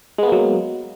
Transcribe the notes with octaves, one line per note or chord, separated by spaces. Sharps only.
F#3 G#3 A#3 B3